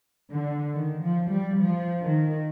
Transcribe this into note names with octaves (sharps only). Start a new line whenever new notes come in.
D3
D#3
F3
G3
F3
D#3